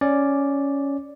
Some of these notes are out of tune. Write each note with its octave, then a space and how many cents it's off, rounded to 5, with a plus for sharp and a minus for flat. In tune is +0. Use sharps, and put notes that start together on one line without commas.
C#4 +5 D5 +0